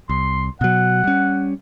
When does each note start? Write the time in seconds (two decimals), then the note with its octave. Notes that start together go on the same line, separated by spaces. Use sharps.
0.09 C2 C6
0.61 B2 F#3 F#5
1.04 G3 C#4